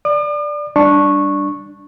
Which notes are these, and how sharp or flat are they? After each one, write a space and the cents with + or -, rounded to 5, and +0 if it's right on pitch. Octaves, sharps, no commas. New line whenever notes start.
D5 +0 D6 +45
G3 +10 D4 +0 C#6 -10